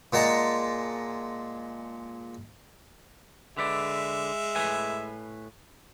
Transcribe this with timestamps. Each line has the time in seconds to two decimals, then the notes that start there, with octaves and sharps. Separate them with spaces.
0.13 A#2 G#3 F#5 A5 A#5
3.57 D3 G#3 B4 D5 E5
4.56 A2 B4 G#5